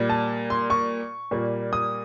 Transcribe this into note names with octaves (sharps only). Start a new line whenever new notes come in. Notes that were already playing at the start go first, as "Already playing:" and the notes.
Already playing: A#2 G3 A#3
A5
C6
C#6
A#2 G3 A#3
D#6